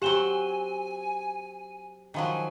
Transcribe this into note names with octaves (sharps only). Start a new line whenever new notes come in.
F#3 C4 G4 F#5 G#5 E7 G7
D#3 F3 F#3 G#5